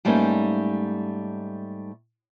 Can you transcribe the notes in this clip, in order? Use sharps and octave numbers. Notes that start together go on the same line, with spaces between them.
G#2 G3 A3 A#3 C#4 D#4